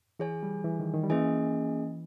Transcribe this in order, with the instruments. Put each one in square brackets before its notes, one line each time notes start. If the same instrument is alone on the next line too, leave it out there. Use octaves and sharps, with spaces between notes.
[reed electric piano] E3 [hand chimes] G#4 C#5 G#5
[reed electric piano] G3
E3
D#3
D#3
G3
[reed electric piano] E3 [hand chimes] A#3 C#4 G#4 D#5 G#5